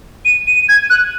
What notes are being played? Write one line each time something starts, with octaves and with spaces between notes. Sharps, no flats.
D#7
D#7
G#6
F#6